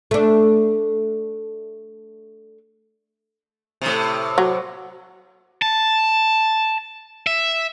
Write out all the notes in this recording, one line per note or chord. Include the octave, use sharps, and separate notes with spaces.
A3 D4
A2 C3
F#3
A5
E5